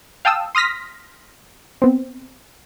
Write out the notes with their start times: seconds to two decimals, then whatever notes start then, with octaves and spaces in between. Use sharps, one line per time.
0.25 F5 G5 A5 D#6 E6
0.55 C6 D#6 F6 A#6 B6
1.82 B3 C4